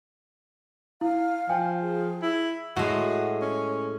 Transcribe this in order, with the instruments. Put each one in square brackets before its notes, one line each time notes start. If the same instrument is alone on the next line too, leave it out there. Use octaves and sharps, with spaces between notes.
[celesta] E4 [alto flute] F5
[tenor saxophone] F3 [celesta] G5 G#5
[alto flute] G#4
[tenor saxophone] E4
[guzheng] A2 G#3 [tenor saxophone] F#4
[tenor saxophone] C#4